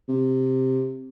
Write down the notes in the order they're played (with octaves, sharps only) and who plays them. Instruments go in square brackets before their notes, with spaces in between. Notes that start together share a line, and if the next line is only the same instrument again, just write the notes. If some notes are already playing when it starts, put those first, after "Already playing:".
[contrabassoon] C3